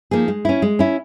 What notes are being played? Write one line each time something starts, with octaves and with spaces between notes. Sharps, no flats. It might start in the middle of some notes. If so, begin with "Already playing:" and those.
F3 A#3 D#4 G#4
G#3
C#4 E4
G#3
C#4 E4